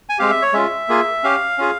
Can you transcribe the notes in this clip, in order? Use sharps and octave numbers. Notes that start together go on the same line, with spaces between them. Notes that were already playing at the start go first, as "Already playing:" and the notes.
G#5
G#3 C4 G4 F5
E5
C#5
G#3 C#4 F4 E5
A#3 F4 G#4
C#4 G4 F5
C#4 F4 G#4